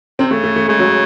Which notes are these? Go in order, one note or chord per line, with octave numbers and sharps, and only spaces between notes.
C3 C4
C#3 A3
A3
A3
C#3 G#3
F#3